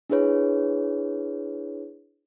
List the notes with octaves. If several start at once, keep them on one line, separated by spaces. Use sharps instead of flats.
D4 E4 G#4 B4 C#5